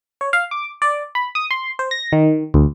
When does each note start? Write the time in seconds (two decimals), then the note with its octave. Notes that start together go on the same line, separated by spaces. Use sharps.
0.21 C#5
0.33 F5
0.51 D6
0.82 D5
1.15 B5
1.35 D#6
1.51 C6
1.79 C5
1.91 A#6
2.12 D#3
2.54 D2